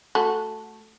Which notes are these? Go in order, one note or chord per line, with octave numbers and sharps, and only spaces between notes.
A3 F#4